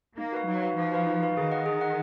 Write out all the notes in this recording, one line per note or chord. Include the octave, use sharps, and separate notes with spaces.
A#3 D#4
F#4 B4 F5
F#3 D#4
F#4 B4 F5
F3 D#4
F#4 B4 F5
D#4
F#4 B4 F5
D#3 G#4
D#5 F#5
G#4
D#5 F#5